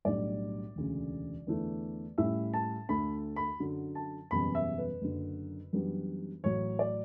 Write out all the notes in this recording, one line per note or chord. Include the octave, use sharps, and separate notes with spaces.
B1 A2 G3 D4 D5
E1 D2 C#3
E2 D3 A3 E4
A2 G3 C#4 E4 E5
A5
D2 D3 A3 B5
B5
F#2 D3 F#3
A5
F#1 E2 B2 G3 C#4 B5
E5
B4
F#1 F#2 D3
F#2 E3 G3 B3 D4
A1 A2 F#3 C#5
D5